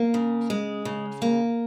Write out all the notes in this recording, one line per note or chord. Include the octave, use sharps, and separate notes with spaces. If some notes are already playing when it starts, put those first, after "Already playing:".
Already playing: A#3
C#3
G#3
C#3
A#3